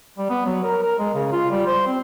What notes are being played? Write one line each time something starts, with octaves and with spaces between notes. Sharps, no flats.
G3
B3
F#3
A#4
A#4
G#3
C#3
F4
G3
C5
C4